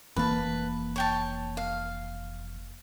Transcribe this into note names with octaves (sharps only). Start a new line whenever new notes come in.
F1 E3 A#3 B4 A5
C#5 G5 A5
F5